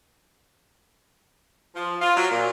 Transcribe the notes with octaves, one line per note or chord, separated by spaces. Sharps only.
F3
F4
F#3
A#2